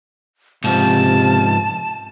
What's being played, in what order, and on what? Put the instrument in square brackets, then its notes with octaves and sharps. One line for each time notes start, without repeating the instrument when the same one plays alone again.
[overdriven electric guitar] G#2 F3 [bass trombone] C3 [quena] A5